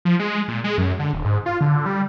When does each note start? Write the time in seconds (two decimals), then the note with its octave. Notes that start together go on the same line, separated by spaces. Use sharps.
0.05 F3
0.19 G#3
0.48 A#2
0.64 G#3
0.78 F#2
0.99 D3
1.13 D#1
1.25 G#2
1.46 F4
1.61 D3
1.86 G3